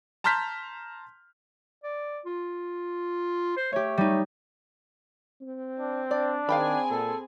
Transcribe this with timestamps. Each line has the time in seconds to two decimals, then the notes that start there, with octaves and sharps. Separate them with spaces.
0.24 A5 A#5 C6 F6 G6 B6
1.83 D5
2.26 F4
3.57 C5
3.73 A3 G4 C#5
3.98 G3 D#4
5.41 C4
5.79 D4
6.11 D4 D5
6.49 D#3 C4 G#4 F5 G5 G#5 B5
6.90 A#2 A4